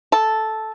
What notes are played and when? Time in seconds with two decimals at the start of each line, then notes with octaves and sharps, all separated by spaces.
0.12 A4